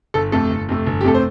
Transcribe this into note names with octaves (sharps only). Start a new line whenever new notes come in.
G1 A4
F2 C3 A3 A4
G1
F2 C3 A3
G1
G4
F2 C3 A3 A4
C5